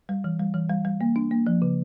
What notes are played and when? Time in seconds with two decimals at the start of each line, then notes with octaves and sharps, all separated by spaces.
0.09 G3
0.24 E3
0.40 G3
0.54 E3
0.69 G3
0.85 G3
1.01 A#3
1.16 D4
1.31 A#3
1.47 F3
1.62 C#3